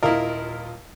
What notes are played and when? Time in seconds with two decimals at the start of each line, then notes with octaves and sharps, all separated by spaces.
0.02 D#1 E4 F4 A#4 D#5